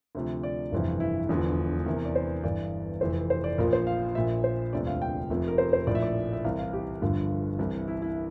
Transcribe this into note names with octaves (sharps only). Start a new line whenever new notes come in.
D2 C3 F3
D5
G1 F2 C3 E3
E4
E1 E2 D3 F3
E2 C3 E3 A#4
D5
C5
G1 G2 E3 D5
F1 F2 E3 C5
C5
D5
A#1 A#2 F3 A#4
C5
F5
A#1 A#2 F3 E5
C5
E1 D2 C3 F3 D5
F5
G5
F1 F2 C3 F3
A#4
C5
C5
A#1 A2 F3 D5
E5
D5
E5
C2 C3 E3 F5
F5
G4
G1 G2 D3 F3
C2 C3 E3
E4
E4